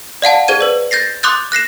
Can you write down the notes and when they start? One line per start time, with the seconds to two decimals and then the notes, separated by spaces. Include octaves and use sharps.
0.22 D5 F5 F#5 A5
0.48 G#4 C5 G#6 D#7
0.61 B4 D5
0.91 G6 A6 A#6 C7
1.23 C6 D6 D#6 F#6 G6 A6
1.52 F#6 A#6 C7 E7